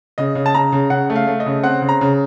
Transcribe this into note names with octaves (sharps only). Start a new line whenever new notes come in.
C#3 D#5
C#3
A5
C#3 A#5
C#3
C#3 F#5
A3
F5
A3
D#5
C#3
C4 F#5
C#3
A#5
C#3